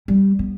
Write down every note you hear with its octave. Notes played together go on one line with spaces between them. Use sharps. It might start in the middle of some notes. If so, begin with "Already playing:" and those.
G3
B3